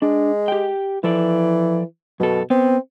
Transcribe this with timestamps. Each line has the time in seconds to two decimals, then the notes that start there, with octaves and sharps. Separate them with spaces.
0.02 G#3 D4
0.48 G4 G5
1.04 E3 F3 A4 D5
2.20 F#2 B2 A4
2.50 B3 C4